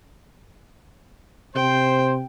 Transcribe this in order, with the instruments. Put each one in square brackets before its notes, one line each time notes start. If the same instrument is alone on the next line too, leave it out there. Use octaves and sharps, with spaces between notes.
[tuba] C3 [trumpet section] C5 [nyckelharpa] G5